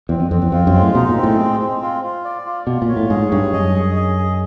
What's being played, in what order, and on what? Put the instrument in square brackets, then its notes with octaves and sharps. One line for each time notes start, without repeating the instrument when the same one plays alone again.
[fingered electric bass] E2 [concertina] C4
[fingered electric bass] F2
[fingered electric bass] F2 [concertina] C4
[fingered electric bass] E2
[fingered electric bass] F2 [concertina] F4
[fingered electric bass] F#2
[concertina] G#3
[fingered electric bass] A2
[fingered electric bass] B2 [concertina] D#4
[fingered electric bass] A#2
[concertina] C4
[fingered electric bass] A2
[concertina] G#3
C4
F4
F4
D5
F4
[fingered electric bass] B2 [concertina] F4
[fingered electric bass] A#2
[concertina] C#5
[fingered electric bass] A2
[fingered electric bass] G#2 [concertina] G#4
[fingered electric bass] G2 [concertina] C#5
[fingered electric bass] F#2 [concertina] D#5
[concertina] G#4
D#5
G#4